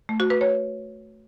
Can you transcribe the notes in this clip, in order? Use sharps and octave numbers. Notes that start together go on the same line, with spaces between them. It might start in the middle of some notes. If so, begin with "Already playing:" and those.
A3
F#4
B4
C#5